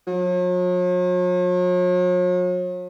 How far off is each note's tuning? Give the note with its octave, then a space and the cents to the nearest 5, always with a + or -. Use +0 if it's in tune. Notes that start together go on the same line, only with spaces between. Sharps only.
F#3 -45